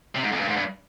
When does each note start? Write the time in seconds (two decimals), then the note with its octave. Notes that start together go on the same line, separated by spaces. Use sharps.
0.15 C3
0.23 G#2
0.32 F2
0.40 G2
0.48 G#2
0.56 G2